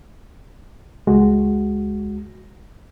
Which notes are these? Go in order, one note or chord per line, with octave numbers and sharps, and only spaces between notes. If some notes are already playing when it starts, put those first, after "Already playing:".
C#2 G#3 F#4